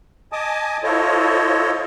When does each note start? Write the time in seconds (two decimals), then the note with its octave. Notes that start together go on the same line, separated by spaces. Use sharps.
0.32 D#5 G#5 A5 D6 D#6
0.83 E4 F4 A4 C5 C#5 D#5